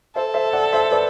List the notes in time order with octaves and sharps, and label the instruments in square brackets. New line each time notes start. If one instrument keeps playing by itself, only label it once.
[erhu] A4 [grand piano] C5 E5
[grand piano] C5 E5
D5 F#5
C5 E5
B4 D5